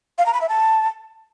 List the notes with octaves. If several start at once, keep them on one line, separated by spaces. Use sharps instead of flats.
F5
A#5
B5
E5
A5